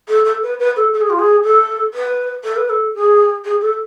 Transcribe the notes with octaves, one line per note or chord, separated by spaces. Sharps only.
A4
A4
B4
B4
A4
A4
G#4
F4
G#4
A4
B4
A4
B4
A4
G#4
G#4
A4